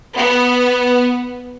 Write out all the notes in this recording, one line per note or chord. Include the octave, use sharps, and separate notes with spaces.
B3